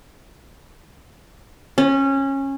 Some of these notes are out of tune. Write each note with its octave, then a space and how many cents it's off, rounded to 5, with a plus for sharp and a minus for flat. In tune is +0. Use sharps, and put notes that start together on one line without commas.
C#4 -20